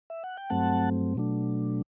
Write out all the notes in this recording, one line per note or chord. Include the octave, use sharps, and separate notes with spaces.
E5
F#5
G5
G2 F#3 A3 C4 F#5 A5
B2 F#3 A3 D4